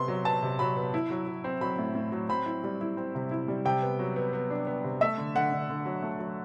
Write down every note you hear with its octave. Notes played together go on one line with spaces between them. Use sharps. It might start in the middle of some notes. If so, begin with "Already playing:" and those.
Already playing: C3 B3 C6
F#3
B3 A5
C3
F#3 B5
B3
E4
F#3
F#3
C4
F#3 B5
A2
A2
F#3
C4 B5
E4
G3
E4
C4
C3
E4
G3
C3 G5
B3
F#3
B3
B3
D4
B3
C3
A3 E5
D3
D3 F#5
D3
D3
F#3
A3
F#3